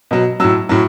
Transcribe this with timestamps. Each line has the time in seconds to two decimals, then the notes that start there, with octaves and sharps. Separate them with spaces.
0.11 B2 F#3
0.40 A2 F#3 E6
0.69 A2 F#3